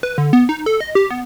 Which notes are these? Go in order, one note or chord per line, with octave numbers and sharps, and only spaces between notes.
B4
D3
B3
D#4
A4
D#5
G4
B3